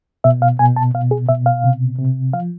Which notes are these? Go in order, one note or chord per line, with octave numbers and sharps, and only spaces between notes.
B2 E5
F5
B2 G#5
A5
B2 F5
G#4
B2 E5
F5
C3
C3
F3 F5